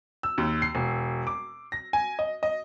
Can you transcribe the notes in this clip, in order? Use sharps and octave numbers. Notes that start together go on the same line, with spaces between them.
E6
D#2
C7
E1
D6
A#6
G#5
D#5
D#5